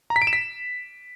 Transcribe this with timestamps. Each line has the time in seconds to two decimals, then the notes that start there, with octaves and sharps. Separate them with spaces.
0.10 A#5
0.16 B6
0.22 D7
0.27 E7
0.33 B6